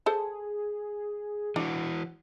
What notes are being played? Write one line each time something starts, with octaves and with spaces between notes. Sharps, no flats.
G#4 A4 C5 A5
E3 D4 F#4